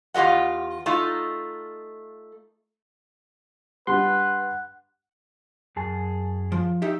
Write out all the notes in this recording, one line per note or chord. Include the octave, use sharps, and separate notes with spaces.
E2 F4 G4 D#5 F#5
A3 D#4 F4
G3 D4 B4 F#5 C6 F#6
F#2 G#4 A5
F3
D#4 G4 E5